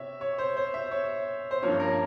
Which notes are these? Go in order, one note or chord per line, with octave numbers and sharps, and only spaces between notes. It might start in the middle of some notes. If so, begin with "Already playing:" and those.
Already playing: C3 C#5 E5
C#5
C5
C5
E5
C#5
C5
G2 F3 A#3 C#4 C#5
A#4